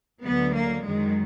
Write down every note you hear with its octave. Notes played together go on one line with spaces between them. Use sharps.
D2 D3 F#3 B3
A#3
F#2 D#3 F#3 G#3